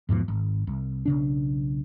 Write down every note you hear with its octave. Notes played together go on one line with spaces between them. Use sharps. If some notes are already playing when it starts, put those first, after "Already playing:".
E2 G#2 B2 F3
G#1
C2
B1 C#3 D4